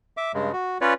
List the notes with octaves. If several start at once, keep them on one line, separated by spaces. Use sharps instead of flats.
E5 D6
G2 C#3 G#3
F#4
C#4 F4 B4 C#5 D5